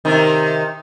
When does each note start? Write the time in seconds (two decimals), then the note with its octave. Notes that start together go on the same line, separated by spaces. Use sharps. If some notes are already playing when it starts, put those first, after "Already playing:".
0.05 C3 D#3